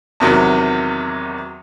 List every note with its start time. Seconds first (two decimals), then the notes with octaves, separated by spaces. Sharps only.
0.20 E2 C3 D#3 F#3